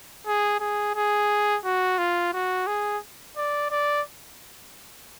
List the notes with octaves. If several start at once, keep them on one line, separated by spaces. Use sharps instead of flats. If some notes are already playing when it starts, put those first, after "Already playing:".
G#4
G#4
G#4
F#4
F4
F#4
G#4
D5
D5